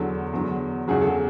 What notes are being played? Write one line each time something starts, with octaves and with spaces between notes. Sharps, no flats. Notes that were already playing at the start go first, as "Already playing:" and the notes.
Already playing: E2 D3 F#3 A4
E2 D3 F#3
E2 C#3 F#3 G#4
A4